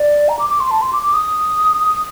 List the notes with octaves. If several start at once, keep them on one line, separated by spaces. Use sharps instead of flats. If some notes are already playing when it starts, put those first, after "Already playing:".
Already playing: D5
A#5
D6
D6
C6
A5
C6
D6
D6
D#6